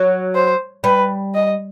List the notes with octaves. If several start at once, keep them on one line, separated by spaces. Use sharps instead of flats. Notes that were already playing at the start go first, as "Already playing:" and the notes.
Already playing: F#3
C5
G3 B4
D#5